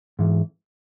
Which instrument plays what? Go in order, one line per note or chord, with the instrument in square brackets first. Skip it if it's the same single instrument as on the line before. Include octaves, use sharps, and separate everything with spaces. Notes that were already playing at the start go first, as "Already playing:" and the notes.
[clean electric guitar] G#2 E3